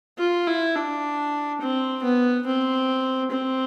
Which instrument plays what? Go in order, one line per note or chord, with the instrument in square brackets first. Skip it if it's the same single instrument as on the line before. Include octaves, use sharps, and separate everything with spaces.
[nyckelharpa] F4
E4
D4
C4
B3
C4
C4